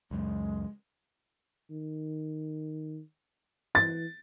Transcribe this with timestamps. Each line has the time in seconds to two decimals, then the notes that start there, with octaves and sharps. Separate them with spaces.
0.11 C#2 F#2 G#3
1.70 D#3
3.75 E3 A6